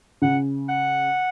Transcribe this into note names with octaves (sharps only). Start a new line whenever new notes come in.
C#3 F#5
F#5